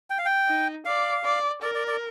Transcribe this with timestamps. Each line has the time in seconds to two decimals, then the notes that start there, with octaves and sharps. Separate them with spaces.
0.10 G5
0.18 F5
0.25 G5
0.48 D#4
0.85 D5 F5
1.25 D5
1.62 A#4 D5
1.75 D5
1.88 D5